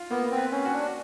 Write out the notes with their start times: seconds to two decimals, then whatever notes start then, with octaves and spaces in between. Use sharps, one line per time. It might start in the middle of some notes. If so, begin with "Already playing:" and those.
Already playing: F4
0.11 A#3 B3
0.31 C4
0.38 B4
0.52 C#4
0.65 F#4
0.72 D4